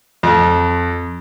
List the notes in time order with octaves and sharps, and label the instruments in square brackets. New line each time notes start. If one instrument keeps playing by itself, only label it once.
[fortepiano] F2